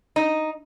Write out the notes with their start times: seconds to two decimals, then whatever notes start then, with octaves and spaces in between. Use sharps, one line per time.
0.16 D#4